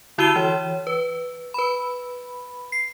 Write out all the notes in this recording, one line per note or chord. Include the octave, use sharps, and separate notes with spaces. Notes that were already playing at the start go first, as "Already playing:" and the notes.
D3 E4 F#4 E6 D#7 G7
E3 C#5
B4
B4 B5
C7